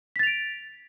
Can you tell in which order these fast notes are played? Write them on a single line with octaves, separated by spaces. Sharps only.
B6 A6 F7 D7